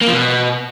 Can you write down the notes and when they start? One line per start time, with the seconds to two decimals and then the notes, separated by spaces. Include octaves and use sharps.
0.01 A#3
0.07 F3
0.13 B2